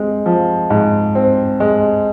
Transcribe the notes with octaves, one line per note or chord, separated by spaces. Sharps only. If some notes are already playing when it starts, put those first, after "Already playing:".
Already playing: G#3 C4
F3
G#2
C4
G#3